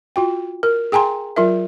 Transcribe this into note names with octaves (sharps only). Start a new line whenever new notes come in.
F4 F#4 G5
A#4
G#4 G5 G#5 A#5 C6
F#3 F4 A#4 E5